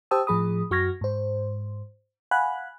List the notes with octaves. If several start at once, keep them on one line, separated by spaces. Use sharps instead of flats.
G4 C5 G5 A5 D#6 E6
A2 F3 G#4 B5 D#6
F#2 F#4 C#6 F6 G#6 A#6
G#2 C5
F5 F#5 G#5 B5 F#6